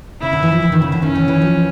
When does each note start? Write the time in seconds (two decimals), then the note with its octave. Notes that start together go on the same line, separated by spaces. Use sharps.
0.22 C#3 E4
0.33 D3
0.42 E3
0.52 F3
0.62 E3
0.72 D#3
0.82 C#3
0.92 D3
1.01 D#3 C#4
1.15 E3
1.28 E3
1.42 F3